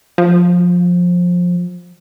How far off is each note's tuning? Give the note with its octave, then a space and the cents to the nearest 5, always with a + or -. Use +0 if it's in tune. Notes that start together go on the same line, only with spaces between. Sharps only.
F3 +20